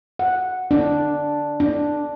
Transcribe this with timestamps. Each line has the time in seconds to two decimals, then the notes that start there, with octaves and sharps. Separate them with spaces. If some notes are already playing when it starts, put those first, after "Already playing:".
0.19 F#5
0.71 D4
1.60 D4